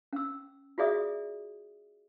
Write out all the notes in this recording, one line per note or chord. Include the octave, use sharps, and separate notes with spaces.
C#4 E6
F4 F#4 G#4 D5 E5 D#6